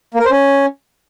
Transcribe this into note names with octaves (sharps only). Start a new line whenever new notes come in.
A#3
A#4
C5
C#4